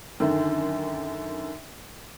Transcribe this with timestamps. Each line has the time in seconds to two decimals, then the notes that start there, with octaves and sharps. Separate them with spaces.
0.20 F#2 D3 D#3